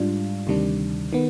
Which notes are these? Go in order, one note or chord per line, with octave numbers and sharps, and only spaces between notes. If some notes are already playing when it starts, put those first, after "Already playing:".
Already playing: G#2 G3 D4 F4
D2 C3 D#3 G3 D4
D#3 B3